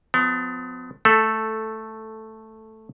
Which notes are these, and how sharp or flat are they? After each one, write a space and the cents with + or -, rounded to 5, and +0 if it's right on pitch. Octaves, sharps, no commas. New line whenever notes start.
F3 +30 B3 +40
A3 +0 A4 -5